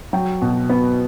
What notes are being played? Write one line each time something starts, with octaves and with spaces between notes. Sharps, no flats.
F#3 G5
B2
B3